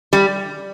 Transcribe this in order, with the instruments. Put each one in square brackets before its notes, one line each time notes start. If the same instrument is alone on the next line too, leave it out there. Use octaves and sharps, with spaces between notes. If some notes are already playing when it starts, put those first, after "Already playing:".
[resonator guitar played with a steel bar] G3